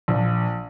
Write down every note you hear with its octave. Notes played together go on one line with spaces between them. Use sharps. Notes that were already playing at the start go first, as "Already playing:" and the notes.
A#1